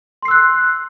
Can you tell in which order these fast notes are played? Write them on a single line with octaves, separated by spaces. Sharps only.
C6 C7 E6 F#6